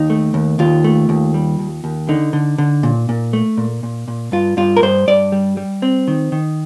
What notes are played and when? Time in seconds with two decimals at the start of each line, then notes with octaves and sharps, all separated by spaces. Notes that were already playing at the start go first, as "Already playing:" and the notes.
Already playing: D#2 D#4
0.10 A3
0.34 D#2
0.59 D#2 F4
0.84 A3
1.09 D#2
1.34 G3
1.59 D#2
1.84 D#2
2.09 D3 D#4
2.33 D3
2.58 D3
2.83 A#2
3.09 A#2
3.33 A3
3.57 A#2
3.83 A#2
4.08 A#2
4.32 G2 F4
4.57 G2 F4
4.76 A#4
4.82 G2 C5
5.08 G2 D5
5.32 G3
5.57 G3
5.82 C4
6.08 D#3
6.32 D#3